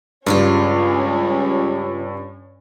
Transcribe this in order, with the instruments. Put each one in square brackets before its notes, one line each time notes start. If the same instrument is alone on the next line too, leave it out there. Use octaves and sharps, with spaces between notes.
[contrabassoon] C#2 [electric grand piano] G2 [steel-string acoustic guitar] C#3 G3 F4 [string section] C#4